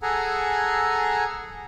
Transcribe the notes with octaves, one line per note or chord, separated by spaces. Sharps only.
G#4 A4 F#5 G#5 A#5